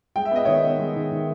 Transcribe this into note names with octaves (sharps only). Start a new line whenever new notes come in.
G#3 G5
E5
B3 D#5
D#3 C#5 E5
B3
G#3
D#3
D#3